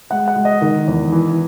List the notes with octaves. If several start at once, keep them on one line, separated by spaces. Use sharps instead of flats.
G#3 F#5
F#5
G#3
D#5
D#3
E2
E3